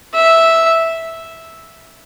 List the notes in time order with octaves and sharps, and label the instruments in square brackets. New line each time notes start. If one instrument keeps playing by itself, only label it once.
[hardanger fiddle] E5